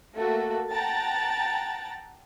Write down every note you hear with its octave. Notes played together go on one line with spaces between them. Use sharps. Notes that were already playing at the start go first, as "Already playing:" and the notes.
A3 A#3 F#4 A4
F#5 G5 A5 A#5 A6